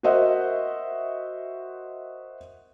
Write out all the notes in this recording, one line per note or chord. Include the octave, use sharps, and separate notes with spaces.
F#4 A#4 C5 D#5 E5 F#5